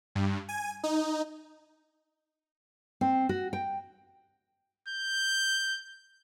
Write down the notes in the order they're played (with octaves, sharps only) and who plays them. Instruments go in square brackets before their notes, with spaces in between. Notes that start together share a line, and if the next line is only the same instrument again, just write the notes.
[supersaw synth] G2
G#5
D#4
[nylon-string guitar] C4
F#4
G5
[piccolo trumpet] G6